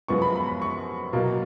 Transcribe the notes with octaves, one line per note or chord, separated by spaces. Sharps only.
F#2 F3 G#3 B3 C#6
B5
B5
B5
C#6
B2 F#3 A#3